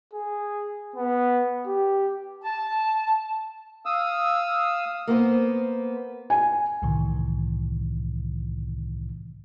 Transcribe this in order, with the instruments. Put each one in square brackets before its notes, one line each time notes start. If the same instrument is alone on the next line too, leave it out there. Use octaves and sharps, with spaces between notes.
[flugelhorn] G#4
B3
G4
[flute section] A5
[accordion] F5 D#6 E6
[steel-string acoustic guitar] A#3 B3 C5
[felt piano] G#5
[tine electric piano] C2 A2 C3 D#3 E3